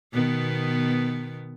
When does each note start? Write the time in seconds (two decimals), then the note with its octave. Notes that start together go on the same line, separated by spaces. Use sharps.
0.13 B2 D#3 B3